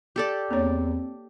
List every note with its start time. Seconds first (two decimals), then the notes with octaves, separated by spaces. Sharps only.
0.16 G4 A4 D5
0.51 E2 A#3 C4 D4 C#5